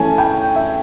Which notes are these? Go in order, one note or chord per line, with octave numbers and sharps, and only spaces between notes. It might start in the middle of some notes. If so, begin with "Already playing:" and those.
Already playing: E3 A3 C#4 G#5 A5
G5
E5